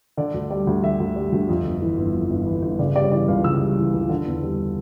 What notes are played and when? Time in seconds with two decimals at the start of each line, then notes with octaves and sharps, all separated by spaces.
0.17 D3 D5
0.34 D2
0.50 G3 D5
0.67 D2
0.83 D3 E5
1.00 D2
1.16 G3
1.32 D2
1.49 F2
1.65 G1
1.82 E3
1.98 G1
2.15 F2
2.30 G1
2.46 E3
2.63 G1
2.79 C#3 D5
2.96 G3 D5
3.04 C#5
3.12 E3 D5
3.28 C#2 F5
3.44 C#3 E6
3.61 G3
3.77 E3
3.93 C#2
4.09 D3
4.26 E2
4.43 G3